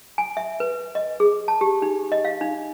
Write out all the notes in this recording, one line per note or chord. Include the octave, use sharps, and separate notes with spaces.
G#5
E5
B4
D#5
G#4
A5
G4
D#4
D#5
F5
D#4